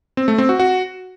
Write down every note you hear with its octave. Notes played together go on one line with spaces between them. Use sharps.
C4
A3
C4
F#4
F#4